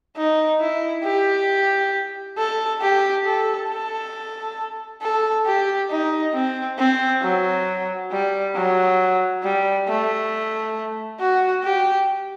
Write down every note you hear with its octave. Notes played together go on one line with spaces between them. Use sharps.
D#4
E4
G4
A4
G4
A4
A4
A4
G4
D#4
C4
C4
F#3
G3
F#3
G3
A3
F#4
G4